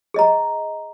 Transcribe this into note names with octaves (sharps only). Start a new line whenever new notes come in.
G#4 D#5 A#5